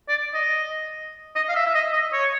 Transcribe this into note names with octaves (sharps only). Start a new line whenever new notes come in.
D5
D#5
D#5
F5
E5
E5
D#5
D#5
C#5